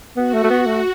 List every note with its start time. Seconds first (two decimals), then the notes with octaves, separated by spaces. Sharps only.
0.16 B3 F#4
0.33 A3
0.44 A3
0.50 B3
0.66 A3